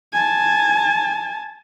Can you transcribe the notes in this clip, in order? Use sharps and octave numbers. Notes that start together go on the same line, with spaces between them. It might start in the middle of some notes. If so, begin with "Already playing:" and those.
G#5 A5